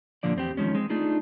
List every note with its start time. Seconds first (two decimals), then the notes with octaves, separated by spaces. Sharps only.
0.23 A#2 D3 F3 D5
0.36 E2 C4 G4
0.57 D#3 F3 G#3 C#4
0.75 G#3 C4
0.90 A3 D4 D#4 F4 G#4